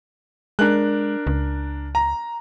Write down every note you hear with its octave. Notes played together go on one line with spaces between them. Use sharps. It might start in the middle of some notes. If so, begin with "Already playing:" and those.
G#3 D4 A#4 F#6
C#2
A#5